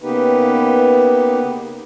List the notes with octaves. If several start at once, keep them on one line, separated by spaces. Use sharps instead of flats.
C#3 A#3 B3 D#4 G4 B4